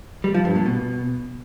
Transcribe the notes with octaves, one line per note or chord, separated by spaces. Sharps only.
G3
F3
G2
A#2
B2